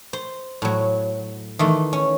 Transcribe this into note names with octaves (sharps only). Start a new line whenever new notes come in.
C5
A2 F#3
D#3 E3 A3
C#4